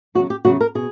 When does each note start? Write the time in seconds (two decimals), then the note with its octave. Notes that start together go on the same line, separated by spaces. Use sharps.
0.15 E2 C#3 F#3 F#4
0.30 G4
0.45 E2 C#3 F#3 F#4
0.61 A#4
0.75 B2 G#4